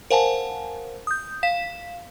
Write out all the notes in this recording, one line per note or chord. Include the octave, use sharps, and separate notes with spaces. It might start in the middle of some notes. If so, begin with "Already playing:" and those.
A#4 C5 F5 F#5 G#5 A5
D#6 G6
F5 B6 E7